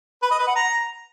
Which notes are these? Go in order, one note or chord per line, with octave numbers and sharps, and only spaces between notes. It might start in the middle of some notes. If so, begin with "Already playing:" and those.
B4
D#5
B4
F#5
A#5